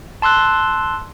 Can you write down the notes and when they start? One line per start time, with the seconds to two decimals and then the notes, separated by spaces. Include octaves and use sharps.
0.22 A5 C6 E6 F#6